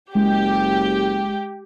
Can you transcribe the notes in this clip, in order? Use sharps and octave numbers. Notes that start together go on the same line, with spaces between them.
F#1 G#3 G4